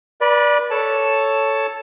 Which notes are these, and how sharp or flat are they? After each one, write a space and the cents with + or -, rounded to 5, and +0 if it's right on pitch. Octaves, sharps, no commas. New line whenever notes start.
B4 -35 D5 +0 B5 +0
A4 +0 C#5 +5 A5 +0